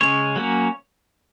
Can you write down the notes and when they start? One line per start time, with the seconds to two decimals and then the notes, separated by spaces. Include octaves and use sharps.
0.01 C#3 G#3 C#4 C#5
0.36 F#3 A#3 C#4